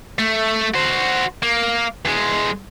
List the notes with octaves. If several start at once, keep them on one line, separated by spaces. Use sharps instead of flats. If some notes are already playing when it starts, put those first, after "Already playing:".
A3
F#4 C5
A#3
E2 G#3